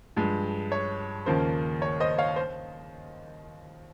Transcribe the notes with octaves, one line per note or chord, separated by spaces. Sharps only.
G2 F3 G#3
C#5
D#2 C#3 F3 A#3 C5
C#5
C5 D#5
C#5 F5
C5